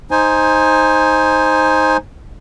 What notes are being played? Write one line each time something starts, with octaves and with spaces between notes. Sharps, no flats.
D#4 C5 G#5